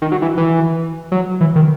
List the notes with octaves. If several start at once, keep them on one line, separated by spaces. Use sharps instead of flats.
D#3
F#3
E3
E3
F#3
E3
D#3